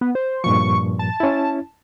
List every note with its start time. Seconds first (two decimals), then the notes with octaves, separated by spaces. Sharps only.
0.01 B3
0.15 C5
0.44 G2 A#2 F3 C#6
0.99 A5
1.20 C#4 E4